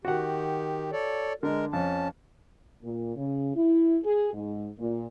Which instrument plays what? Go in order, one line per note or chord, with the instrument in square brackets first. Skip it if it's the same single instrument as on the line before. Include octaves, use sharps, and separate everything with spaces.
[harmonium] D#3 G4 [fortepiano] F#4 F#5
[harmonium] A4 C#5 D5
[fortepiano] D3 [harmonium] G#3 A#4
[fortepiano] F2 [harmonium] C#4 A5
[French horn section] A#2
C#3
E4
G#4
G#2
A#2